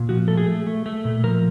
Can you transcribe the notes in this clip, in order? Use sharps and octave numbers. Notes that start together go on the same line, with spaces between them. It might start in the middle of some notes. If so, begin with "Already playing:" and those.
Already playing: A#2
F3 F#4
A3 A4
G#4
A3
A3
A3
A#2
F3 A#4